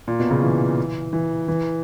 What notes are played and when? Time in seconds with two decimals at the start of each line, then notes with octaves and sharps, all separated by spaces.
0.08 A#2
0.20 B2
0.31 C#3
0.43 E3
1.13 E3
1.48 E3